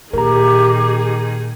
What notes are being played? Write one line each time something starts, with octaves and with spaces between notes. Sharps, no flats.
A#2 D#3 G4 G#4 A#4 A#5